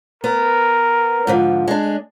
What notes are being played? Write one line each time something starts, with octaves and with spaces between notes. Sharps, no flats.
B3 A#4
G#2 D3 F3
G#3 D4